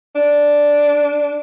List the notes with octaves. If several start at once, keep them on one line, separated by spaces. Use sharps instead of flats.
D4